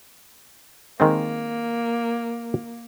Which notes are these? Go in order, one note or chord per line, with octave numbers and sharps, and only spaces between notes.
D#3 G#3 A#3 C4